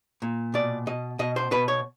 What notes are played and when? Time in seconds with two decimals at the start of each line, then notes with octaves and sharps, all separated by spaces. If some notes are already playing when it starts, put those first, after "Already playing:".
0.22 A#2
0.54 B2 D5
0.87 B2 D#5
1.19 B2 D#5
1.36 C5
1.51 B2 B4
1.68 C#5